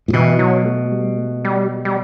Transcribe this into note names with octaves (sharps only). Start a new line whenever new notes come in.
A2
B2 E3
F#3
A3
G3
A3
G3
G3